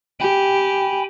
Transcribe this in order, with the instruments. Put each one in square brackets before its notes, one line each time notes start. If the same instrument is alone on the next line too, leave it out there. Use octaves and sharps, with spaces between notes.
[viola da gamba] G4 [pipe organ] G5 G#5 B5